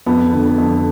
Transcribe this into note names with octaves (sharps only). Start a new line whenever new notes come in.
F2 B3
D3
F2